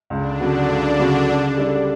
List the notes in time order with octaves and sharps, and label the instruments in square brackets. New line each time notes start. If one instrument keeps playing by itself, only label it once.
[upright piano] C#2 [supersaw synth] D3 D4
[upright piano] C#3 F#3 B3 F#4
C#2
C#3 F#3 B3 F#4
C#3
G3 D4 A4